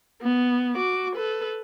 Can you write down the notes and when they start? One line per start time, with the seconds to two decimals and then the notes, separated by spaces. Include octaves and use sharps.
0.21 B3
0.76 F#4 D6
1.16 A4 B4